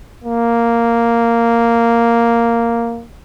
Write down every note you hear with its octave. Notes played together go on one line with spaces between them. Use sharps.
A#3